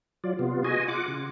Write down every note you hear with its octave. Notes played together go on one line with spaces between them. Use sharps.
F#3 F4 D5
C3 B3 F4
F#4 G#4 D#5 G#5
F4 F#5 D6
C#3